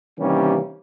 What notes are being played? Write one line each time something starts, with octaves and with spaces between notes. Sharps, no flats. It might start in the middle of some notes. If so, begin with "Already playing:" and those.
C3 D#3 E3 G3 A#3 C#4